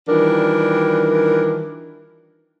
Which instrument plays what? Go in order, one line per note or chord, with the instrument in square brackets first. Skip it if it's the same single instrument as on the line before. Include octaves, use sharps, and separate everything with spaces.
[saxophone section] D#3 E3 G3 D4 F4 A#4